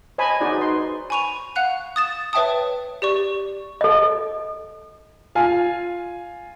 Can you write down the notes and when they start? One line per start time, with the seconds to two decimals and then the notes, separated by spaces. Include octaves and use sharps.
0.18 C5 C#5 D#5 G#5 A5 B5
0.41 D#4 F#4 G#4 C5 D5
0.58 B4 C6
1.10 G#5 B5 C#6 D#7 F7
1.56 F5 F#5 F#6 F7
1.96 D#6 A6 E7
2.33 B4 C#5 E5 G5 A5 D#6
3.02 G4 D5 C#6
3.81 A4 D#5
5.35 F4 F5 G#5